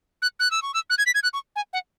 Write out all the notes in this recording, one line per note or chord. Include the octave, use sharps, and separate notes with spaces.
F#6
F#6
E6
C#6
E6
F#6
G#6
B6
G#6
F#6
C#6
G#5
F#5